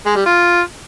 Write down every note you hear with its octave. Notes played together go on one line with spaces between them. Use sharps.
G#3
G3
F4